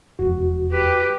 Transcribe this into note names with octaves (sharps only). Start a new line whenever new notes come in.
E1 F2 F#4
G4 B4